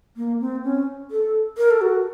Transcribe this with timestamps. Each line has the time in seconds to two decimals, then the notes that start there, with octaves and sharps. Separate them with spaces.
0.17 A#3
0.40 C4
0.64 C#4
1.11 A4
1.58 A#4
1.71 A4
1.81 F#4